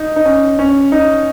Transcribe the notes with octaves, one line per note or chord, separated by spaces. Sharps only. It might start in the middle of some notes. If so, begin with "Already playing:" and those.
Already playing: D#4
D#4
C#4
C#4
D#4